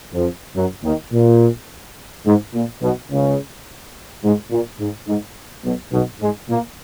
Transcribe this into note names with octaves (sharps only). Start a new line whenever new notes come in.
F2 F3
F#2 F#3
D#2 D#3
A#2
G#2
A#2
B1 B2
C#2 C#3
G#2
A#2
G#2
G#2
B1 B2
B1 B2
G#2 G#3
A#2 A#3